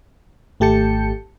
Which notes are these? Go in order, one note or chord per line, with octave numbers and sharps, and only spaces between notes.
G#1 A3 G4 A5 G6 C#7